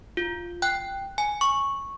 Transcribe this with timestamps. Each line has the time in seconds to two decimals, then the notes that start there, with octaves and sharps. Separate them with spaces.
0.17 F4
0.62 G5 F#6
1.18 G#5
1.41 C#6